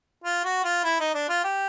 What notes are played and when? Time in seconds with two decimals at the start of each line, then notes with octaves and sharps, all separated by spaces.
0.24 F4
0.44 F#4
0.64 F4
0.84 E4
1.00 D#4
1.14 D4
1.29 F4
1.44 G4